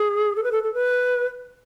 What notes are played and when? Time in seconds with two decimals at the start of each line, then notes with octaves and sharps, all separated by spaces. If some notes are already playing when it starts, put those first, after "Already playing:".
Already playing: G#4
0.36 A4
0.44 B4
0.52 A4
0.63 A4
0.74 B4